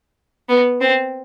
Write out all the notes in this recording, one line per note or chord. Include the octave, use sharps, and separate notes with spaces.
B3
C4